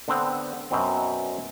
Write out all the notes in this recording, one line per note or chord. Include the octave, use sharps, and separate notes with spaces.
D3 B3 C4
F#2 B2 C4